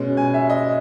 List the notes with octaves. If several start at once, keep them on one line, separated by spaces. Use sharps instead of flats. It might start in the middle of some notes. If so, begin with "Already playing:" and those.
Already playing: B2 G#3 C#4
G#5
E5
D#5